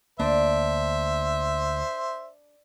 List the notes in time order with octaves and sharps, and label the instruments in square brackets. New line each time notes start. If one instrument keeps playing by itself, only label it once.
[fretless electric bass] D2 A#3 [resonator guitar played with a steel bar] D4 [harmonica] C5 E5